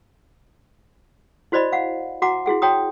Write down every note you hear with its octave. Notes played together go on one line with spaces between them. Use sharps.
E4 F#4 C5 D5 D#5 B5
F5 F#5
F#4 F#5 A#5 D6
E4 F#4 G#4 F#5
F#4 C#5 G5 A#5 D#6